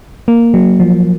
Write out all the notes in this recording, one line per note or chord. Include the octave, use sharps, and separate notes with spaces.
A#3
F#3
F3